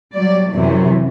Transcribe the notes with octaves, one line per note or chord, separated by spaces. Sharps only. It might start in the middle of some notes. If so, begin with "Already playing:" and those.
F#3 G3 D5
F#2 C3 E3